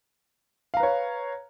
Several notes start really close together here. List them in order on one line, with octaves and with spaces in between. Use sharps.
F5 A#5 B4 C#5